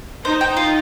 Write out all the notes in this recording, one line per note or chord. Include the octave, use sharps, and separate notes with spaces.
D#4 C5
G5
F4